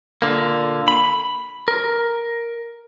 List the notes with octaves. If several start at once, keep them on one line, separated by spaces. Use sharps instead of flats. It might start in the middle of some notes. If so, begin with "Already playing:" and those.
A#2 D3 A#3
B5
A#4